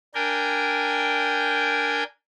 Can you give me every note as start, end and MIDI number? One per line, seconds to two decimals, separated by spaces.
0.15 2.03 62
0.15 2.03 70
0.15 2.03 79
0.15 2.03 80